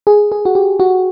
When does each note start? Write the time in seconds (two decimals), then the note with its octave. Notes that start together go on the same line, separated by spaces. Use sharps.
0.07 G#4
0.32 G#4
0.45 F#4
0.55 G4
0.80 F#4